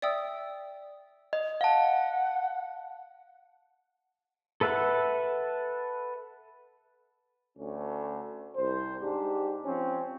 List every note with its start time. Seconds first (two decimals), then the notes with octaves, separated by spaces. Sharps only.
0.02 D5 E5 G5 D#6 E6
1.33 D#5
1.61 F5 F#5 A5
4.61 A4 B4 E5 F#5 A5
7.58 D2 C#4
8.57 C2 C5
9.01 G#2 D4 G4
9.65 F3 C4 C#4